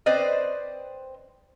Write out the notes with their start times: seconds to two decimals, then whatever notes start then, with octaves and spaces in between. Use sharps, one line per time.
0.06 C4 B4 C5 D5 D#5